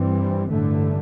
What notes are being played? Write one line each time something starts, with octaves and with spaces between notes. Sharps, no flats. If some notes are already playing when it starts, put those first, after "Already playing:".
Already playing: G2 E3 G3 C4
A1 G2 D3 A3